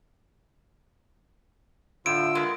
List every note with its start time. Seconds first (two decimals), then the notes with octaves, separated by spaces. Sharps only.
2.06 A2 D3 F4 E6 D7
2.35 G#3 B3 A#4